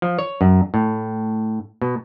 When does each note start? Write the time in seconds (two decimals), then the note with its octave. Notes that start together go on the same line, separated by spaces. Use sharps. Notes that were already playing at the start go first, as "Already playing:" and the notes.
0.02 F3
0.19 C#5
0.41 F#2
0.74 A2
1.82 B2